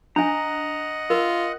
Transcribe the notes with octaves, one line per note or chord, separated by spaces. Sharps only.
D4 D#5 F#5 G#5 A#5
F4 A#4